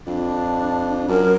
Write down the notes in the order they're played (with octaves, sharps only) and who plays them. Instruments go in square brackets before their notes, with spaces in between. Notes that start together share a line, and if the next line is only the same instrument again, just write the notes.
[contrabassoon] F2 [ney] D4
[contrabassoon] F#2 [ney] A#4